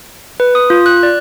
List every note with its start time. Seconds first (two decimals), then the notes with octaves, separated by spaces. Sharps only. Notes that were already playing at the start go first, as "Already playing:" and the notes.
0.40 B4
0.55 D#6
0.70 F4
0.86 F#6
1.03 D5